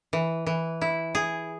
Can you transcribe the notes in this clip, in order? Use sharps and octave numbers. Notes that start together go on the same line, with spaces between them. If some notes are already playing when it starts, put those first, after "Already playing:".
E3
E3
E4
G#4